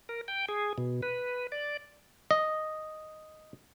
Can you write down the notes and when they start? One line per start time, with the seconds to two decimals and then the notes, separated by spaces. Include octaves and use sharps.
0.09 A#4
0.28 G5
0.49 G#4
0.78 B2
1.03 B4
1.52 D5
2.31 D#5